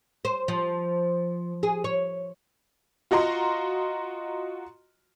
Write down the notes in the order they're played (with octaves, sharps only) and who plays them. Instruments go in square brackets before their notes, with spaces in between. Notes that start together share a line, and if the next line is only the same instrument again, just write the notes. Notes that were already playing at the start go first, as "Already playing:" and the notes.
[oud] C5
F3
G#4
C#5
[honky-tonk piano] F4 F#4 D#5 A#5 C6